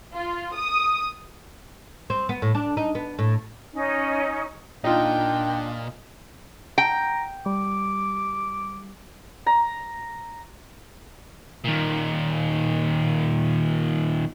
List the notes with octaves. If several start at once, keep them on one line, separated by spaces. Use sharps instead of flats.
F4
D#6
C4
B3
A2
D4
D#4
B3
A2
C#4 D#4
A#2 D4 D#4 F4 G5
G5 A#5
G3 D6
A#5
D#2 A#2